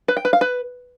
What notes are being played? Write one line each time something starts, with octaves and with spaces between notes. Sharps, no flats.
B4
G5
B4
F5
B4